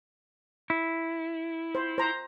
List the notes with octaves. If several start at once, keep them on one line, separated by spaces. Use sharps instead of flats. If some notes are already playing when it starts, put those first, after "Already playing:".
E4
C5
C5 A#5